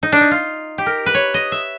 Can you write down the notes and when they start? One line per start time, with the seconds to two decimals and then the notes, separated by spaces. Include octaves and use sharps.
0.03 D#4
0.12 D4
0.21 D#4
0.31 F4
0.78 G4
0.86 A#4
1.06 B4
1.14 C#5
1.34 D#5
1.52 E5